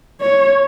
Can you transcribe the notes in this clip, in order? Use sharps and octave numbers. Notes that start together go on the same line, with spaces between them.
C#5